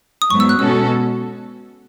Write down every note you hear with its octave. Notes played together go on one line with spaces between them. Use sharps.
D#6
G#2 F#3 B3 C#6
E6
F#6
B2 G#3 C#4 F#4 A4 E6